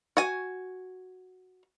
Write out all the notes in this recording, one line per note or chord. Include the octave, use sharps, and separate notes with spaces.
F#4 G#5